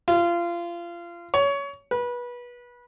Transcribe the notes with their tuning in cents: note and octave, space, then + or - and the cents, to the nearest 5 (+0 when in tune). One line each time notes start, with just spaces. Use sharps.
F4 -25
C#5 +20
B4 -25